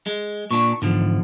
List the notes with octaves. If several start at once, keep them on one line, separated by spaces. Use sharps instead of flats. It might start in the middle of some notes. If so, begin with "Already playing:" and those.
G#3
A#2 D4 C#6
E2 G#2 D3 F3